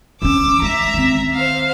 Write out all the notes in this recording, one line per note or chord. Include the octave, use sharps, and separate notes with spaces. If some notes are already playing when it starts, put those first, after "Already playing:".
E3 C#4 D6 E6
G#3 E5 A#5
D#3 C4
C5 F5